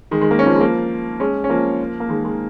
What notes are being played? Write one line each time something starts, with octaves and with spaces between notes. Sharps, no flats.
D#3 G#3
D#3 G#3
A#3
C#4
F3 A#3
G#3
F3 A#3
G#3 C#4
C#4
F3 A#3
A#3
D#3 G#3
D#3 G#3